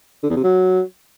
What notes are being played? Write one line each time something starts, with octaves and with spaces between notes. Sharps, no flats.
D3
E2
C3
F#3